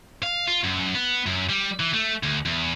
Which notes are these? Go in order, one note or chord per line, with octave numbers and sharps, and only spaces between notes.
F5
F4
F#2
B3
F#2
G3
E3
A3
D2
E2